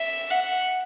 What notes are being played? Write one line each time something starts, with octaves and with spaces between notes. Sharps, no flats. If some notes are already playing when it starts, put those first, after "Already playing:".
Already playing: E5
F#5